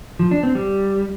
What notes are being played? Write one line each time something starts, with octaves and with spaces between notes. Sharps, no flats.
F3
D4
C4
G3